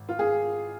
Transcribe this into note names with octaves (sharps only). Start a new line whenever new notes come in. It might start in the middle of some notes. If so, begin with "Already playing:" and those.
Already playing: G#1
F4
G#4